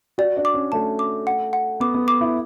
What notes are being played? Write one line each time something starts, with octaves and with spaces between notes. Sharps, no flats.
F#4 D5
D4
D6
C#4
A3 A5
D6
F#5
F#5
B3 D6
B3
D6
E4